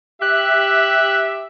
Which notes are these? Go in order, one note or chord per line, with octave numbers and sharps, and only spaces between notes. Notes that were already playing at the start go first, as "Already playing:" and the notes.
G4 E5 F#6